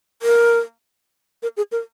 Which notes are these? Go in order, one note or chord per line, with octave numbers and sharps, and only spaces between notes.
A#4
A#4
G#4
A#4